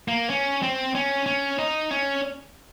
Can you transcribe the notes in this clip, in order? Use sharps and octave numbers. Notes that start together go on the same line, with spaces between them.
A#3
C#4
C4
C#4
C#4
D#4
C#4